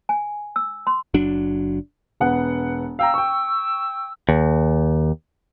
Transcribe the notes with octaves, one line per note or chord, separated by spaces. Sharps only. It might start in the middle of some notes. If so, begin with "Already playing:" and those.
G#5
E6
C6
F#1 F#3 D4
E1 B3 F#5
F5 G5 A#5 E6
G5 C#6
D#2